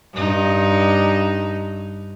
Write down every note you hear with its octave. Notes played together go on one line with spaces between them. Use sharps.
G2 D#4